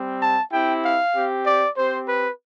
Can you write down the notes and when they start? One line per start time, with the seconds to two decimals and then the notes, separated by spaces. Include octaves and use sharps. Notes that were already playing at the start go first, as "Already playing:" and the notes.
Already playing: G3 C4 G4
0.19 A5
0.51 C4 E4 G4 G5
0.82 F5
1.14 C4 G4
1.46 D5
1.77 C4 G4 C5
2.07 B4